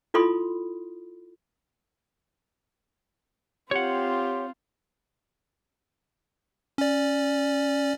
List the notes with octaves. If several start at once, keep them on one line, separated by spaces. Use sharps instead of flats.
E4 F4 A4 B5 C6 D#6
C4 F4 G4 C#5 F#5
C#4 D5